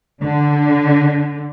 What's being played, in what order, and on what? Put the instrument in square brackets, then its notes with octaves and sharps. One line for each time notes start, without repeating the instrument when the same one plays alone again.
[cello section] D3